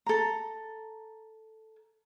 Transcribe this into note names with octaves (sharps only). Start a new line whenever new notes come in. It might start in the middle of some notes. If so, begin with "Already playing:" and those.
A4 A#5